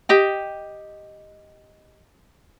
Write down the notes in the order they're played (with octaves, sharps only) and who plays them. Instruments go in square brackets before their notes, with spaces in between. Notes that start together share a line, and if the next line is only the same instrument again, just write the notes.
[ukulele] G4 D#5 G5